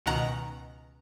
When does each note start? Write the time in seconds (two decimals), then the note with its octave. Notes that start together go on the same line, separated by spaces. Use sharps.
0.06 C#2 B2 D#3 F#5 A#5